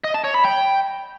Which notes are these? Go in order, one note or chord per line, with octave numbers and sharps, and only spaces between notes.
D#5
A5
C#5
B5
G5